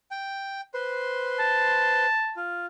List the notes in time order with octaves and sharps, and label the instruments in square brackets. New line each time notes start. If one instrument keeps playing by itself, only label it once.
[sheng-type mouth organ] G5
B4 C5 C6
[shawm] A5
[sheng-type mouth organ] F4